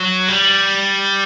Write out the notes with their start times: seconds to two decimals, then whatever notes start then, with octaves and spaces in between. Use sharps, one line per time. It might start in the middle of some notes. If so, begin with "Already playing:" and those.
Already playing: F#3
0.28 G3